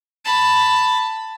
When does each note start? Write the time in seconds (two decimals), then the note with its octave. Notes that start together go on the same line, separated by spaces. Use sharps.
0.25 A5 B5